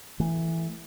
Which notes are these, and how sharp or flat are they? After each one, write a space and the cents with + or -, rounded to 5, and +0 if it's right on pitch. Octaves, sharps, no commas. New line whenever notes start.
E3 +0 A3 +0